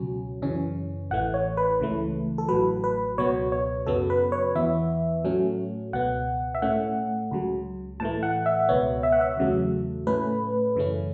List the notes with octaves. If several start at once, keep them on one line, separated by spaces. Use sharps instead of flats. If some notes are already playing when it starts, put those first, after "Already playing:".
Already playing: C#2 B2 F#3 C#4
F#2 C#3 E3 C#4
A1 A2 E3 A3 F#5
C#5
B4
C#2 C#3 E3 A3
A4
A1 A2 F#3 B4
B4
C#2 B2 F#3 B3 C#5
C#5
F#2 C#3 F#3 B3 A4
B4
C#5
E2 E3 B3 E5
A2 F#3 A3 C#4
C#2 B2 B3 F#5
E5
A2 A3 C#4 F#5
C#2 C#3 F#3
A2 E3 A3 A5
F#5
E5
C#2 B2 B3 C#5
E5
F#5
E5
E2 C#3 F#3 A3
A2 A3 C#4 B4
F#2 C#3 E3 A3 C#4